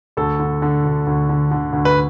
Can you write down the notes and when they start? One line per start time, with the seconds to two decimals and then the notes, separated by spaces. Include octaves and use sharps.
0.17 D2 A4
0.40 D3
0.62 D3
0.85 D2
1.07 D2
1.29 D3
1.51 D3
1.73 D2
1.85 B4